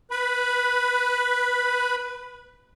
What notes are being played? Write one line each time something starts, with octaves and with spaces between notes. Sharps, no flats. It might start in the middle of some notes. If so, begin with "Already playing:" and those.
B4 B5